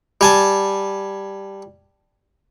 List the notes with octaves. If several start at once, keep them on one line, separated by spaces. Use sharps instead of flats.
G3 G#5 A5